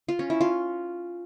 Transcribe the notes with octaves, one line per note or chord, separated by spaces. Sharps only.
F4
C#4
E4
F4